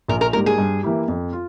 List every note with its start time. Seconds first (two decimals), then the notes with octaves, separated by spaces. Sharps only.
0.08 A#1 A#4
0.21 A#4
0.33 G#2 G3 A#3 A#4
0.46 G#4
0.58 G2
0.83 E3 A#3 E4 G4
1.08 F2
1.33 F4